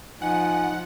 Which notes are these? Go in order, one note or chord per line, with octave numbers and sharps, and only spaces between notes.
F3 D#4 F#5 G#5